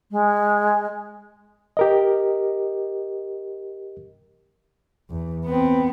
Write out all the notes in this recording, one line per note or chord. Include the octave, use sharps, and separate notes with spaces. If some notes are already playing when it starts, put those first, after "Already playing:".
G#3
G4 A#4 D#5
E2
B3 C4